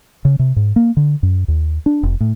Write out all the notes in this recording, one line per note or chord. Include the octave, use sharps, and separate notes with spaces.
C#3
C3
G#2
A#3
D3
F#2
D#2
D4
F1
A2